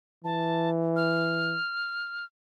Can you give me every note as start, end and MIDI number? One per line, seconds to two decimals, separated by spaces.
0.24 1.57 52
0.24 0.70 81
0.96 2.25 89